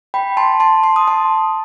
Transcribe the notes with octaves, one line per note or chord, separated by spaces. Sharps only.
G5 B5
A5 C6
A5 C6
C6
D#6
A5 C6